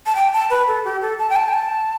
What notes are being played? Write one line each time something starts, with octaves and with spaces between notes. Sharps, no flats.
A5
G5
A5
B4
A4
G4
A4
A5
G5
A5
G5
A5